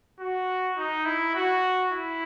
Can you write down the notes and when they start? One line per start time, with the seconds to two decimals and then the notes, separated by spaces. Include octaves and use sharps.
0.20 F#4
0.77 D#4
1.05 E4
1.35 F#4
1.92 E4